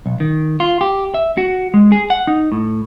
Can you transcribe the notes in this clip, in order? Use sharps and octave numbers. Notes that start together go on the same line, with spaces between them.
B1
D#3
F4
G4
E5
F#4
G#3
G#4
F#5
D#4
A2